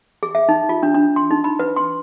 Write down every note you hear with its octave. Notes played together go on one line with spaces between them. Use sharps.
G#4
E5
D#4
F4
D4
D4
C6
D#4
B5
B4
C6